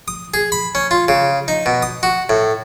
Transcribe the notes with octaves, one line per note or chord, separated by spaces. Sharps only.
D#6
G#4
B5
C#4
F4
C#3
D#4
B2
D#6
F#4
A2